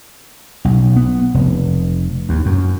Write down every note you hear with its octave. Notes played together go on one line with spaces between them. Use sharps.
B1
B3
F1
D#2
F#2